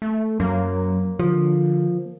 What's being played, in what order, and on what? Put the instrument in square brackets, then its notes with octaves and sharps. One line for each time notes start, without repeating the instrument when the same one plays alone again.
[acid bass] A3
[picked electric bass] F#2 [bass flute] F#3 [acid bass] A#3
[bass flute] D3 [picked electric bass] F3